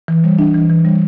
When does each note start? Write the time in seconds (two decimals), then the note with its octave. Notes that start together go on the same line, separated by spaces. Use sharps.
0.08 E3
0.24 G3
0.39 D4
0.55 E3
0.69 E3
0.85 G3